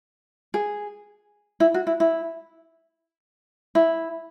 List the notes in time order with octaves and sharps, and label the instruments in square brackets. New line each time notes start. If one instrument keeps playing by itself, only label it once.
[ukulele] G#4
E4
F#4
E4
E4
E4